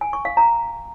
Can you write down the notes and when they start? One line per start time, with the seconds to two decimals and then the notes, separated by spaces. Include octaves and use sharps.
0.01 G#5
0.13 C#6
0.25 F5
0.37 A#5